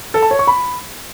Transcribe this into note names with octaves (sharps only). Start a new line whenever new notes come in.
A4
A5
C#5
C#6
B5